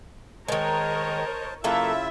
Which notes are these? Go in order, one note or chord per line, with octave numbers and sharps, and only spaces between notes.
D#3 G#3 A#4 C5 C#5 D#5 A5
C#3 F#3 A#3 E4 F4 A4 E5